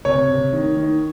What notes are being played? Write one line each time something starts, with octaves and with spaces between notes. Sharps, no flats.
C3 C#5
C3
D#3
D#3